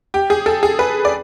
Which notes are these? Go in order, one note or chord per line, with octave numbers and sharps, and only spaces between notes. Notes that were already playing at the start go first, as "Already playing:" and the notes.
G4
G#4
A4
G#4
B4
D5